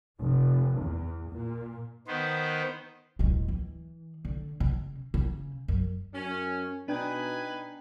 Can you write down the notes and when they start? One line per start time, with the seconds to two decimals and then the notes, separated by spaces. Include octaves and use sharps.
0.20 F1
0.80 E2
1.31 A#2
2.07 D#3 B3 C5
3.19 D1 G#3
3.48 E3
4.25 D3
4.60 C#3
5.14 C#3
5.68 F#2
6.14 F#2 C#4
6.88 B2 D4 D#4 B4 G5 G#5